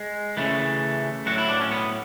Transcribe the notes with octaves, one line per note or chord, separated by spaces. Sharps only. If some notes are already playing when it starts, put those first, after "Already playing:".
Already playing: G#3
C#3 E3 A3
A2 F#3 F#4
E4
D4
C#4
B3